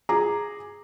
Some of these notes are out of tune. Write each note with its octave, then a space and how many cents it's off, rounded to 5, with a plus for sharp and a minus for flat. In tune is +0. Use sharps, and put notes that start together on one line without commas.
G#4 +0 A#5 +0 D6 +10